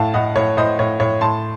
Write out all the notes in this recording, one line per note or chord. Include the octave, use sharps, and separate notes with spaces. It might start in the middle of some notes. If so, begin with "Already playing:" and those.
Already playing: A2 F5 A5
A2 D#5 F#5
A2 C#5
A2 C5 D#5
A2 C#5
A2 C#5
A2 A5 C6